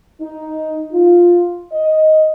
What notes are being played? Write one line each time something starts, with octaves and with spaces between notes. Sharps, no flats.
D#4
F4
D#5